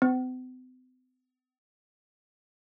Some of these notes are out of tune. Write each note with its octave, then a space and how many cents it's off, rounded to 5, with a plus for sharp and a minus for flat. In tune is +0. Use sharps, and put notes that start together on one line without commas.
C4 -45